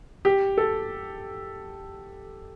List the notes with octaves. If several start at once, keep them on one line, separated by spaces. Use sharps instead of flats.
G4
A4